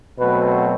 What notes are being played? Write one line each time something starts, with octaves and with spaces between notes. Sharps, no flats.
B2 F#3 A3 C4 B4